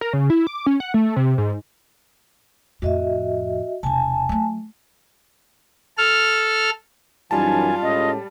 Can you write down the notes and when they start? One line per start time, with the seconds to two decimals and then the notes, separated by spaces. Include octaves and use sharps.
0.01 A#4
0.13 C#3
0.30 E4
0.47 D6
0.66 C#4
0.80 F#5
0.94 A3
1.16 C3
1.38 G#2
2.82 F2 A2 F#4 D#5 E5
3.83 E1 C3 G#5 A5
4.29 F#3 A3
5.98 A4 F6
7.31 F#2 E3 G3 D#4 F4 G#5 A5
7.82 A2 G#3 C#4 D#5